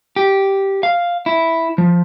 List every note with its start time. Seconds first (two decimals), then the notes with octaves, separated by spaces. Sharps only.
0.16 G4
0.83 F5
1.26 E4
1.78 F3